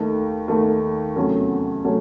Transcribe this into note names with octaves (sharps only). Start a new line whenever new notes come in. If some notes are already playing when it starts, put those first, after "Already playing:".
Already playing: D#2 D#3 A3
D#2 D#3 A3
E2 C3 F#3 A3 C#4
C3 F#3 A3 C#4